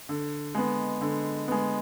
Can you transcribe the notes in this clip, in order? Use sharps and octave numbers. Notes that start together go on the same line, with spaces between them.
D3
G#3 B3
D3
G#3 B3